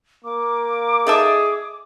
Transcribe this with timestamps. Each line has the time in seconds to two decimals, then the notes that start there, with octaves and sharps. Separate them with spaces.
0.24 A#3 D6
1.07 D#4 G#4 A4 E5